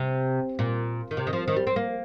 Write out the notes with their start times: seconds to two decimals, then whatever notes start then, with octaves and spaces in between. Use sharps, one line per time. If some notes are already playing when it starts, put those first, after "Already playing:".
Already playing: C3
0.59 A#2
1.11 D#3
1.17 C3
1.27 D#3
1.33 F3
1.48 D#3
1.56 G3
1.67 C4
1.76 A#3